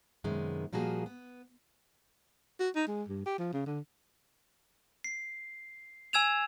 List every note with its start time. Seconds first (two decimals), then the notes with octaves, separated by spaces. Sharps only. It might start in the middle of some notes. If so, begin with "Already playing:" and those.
0.24 F#2 C3 D#3 G#3 B3
0.73 A#2 F3 G3 A#3 F#4 G#4
1.06 B3
2.60 F#4
2.75 D#4
2.88 G#3
3.08 G2
3.26 G4
3.39 F3
3.53 C#3
3.66 D3
5.04 C7
6.13 G#5 E6 G#6 E7 F7